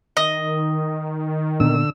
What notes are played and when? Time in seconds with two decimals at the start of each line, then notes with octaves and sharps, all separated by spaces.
0.17 D#3 D#5
1.60 A#2 D3 B3 D4 E6